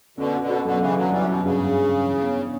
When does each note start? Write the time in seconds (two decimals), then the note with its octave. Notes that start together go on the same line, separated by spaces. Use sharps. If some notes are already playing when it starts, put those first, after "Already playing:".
0.17 B2 D3 C#4
0.33 F#4
0.41 B2 D3
0.50 B4
0.64 B2 D3 F#3
0.80 C#3 E3 C#4
0.96 D3 F#3 F#4
1.11 E3 F#3 G3
1.27 B2 C#4
1.43 G2 C#3
1.58 G2
1.75 F#3
1.90 C#4
2.05 E3
2.21 B3
2.37 D4